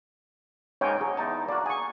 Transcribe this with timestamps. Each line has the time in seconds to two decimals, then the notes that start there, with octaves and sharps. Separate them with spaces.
0.81 G#2 C#3 A#3 C#5 G5 G#5
1.01 F#3 G#4
1.17 E2 D#4 A5
1.48 A#3 F#4 D5
1.66 G#4 G#5 C#6